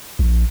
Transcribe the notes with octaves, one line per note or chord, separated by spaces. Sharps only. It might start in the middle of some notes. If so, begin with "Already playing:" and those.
A#1